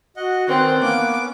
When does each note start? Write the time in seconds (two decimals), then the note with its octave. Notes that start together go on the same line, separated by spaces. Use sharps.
0.16 F#4 D#5 F#5
0.49 D#3 C4 C#4 B4 D5
0.82 A#3 B3 C#4 D6